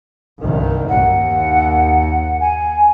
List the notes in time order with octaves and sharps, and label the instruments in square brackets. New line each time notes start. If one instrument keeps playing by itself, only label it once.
[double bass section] C2 G2 D#3
[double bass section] D#2 [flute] F#5
[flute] G#5